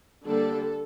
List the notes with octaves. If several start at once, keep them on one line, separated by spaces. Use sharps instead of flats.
D3 G3 A#3 D4 A4